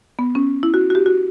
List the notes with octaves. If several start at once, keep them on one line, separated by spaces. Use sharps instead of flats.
B3
C#4
E4
F#4
F#4
G4
F#4